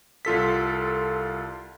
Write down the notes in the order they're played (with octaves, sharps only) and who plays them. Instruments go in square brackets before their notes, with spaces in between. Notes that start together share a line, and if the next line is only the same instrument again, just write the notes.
[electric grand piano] C2 F4 A4 B6